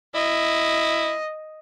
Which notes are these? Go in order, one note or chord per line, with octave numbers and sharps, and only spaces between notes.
E4 D#5